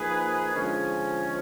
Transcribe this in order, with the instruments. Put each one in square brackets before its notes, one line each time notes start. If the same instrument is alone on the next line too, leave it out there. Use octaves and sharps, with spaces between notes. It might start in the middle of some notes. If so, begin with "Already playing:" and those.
Already playing: [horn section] F3 A#3 D#4 G#4 B4
D3 F3 G#3 C#4